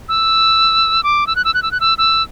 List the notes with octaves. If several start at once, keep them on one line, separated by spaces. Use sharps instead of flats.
E6
D6
E6
F#6
E6
F#6
E6
F#6
E6
E6